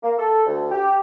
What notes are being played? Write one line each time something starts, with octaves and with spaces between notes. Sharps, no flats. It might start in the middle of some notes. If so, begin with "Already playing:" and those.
A#3
A4
D2
G4